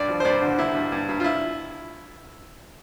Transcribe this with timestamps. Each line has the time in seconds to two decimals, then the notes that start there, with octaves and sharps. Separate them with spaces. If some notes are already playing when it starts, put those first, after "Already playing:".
Already playing: G2 D5
0.08 F3
0.20 C5
0.25 G2 D5
0.42 D3
0.58 G2 E4
0.75 G2
0.92 G2
1.09 G2
1.20 F4
1.24 E4